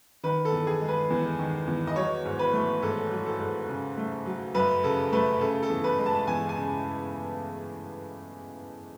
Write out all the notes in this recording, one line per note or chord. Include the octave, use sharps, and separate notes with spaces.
D#3 B4
A4
E2
G#4
G#3
B4
E2
D#3
E2
D#5
F#3 C#5
G#2
B4
A3
G#2 A4
F#3
A4
G#2
C#3
A3
F#3
F#2 B4
C#3 A4
A3 B4
C#3 A4
A4
E2
B4
G#3
A5
E2 G#5
G#5
C#3